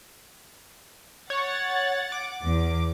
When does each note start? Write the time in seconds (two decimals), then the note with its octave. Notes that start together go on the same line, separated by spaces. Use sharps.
1.30 C#5 F#5 A6
2.12 D6
2.43 E2